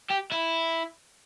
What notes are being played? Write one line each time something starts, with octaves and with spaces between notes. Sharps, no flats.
G4
E4